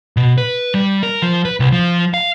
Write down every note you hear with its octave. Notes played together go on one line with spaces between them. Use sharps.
B2
B4
G3
A#4
F3
B4
C2
F3
F5